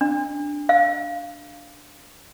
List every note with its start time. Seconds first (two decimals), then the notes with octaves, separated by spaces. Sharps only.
0.01 D4
0.69 F5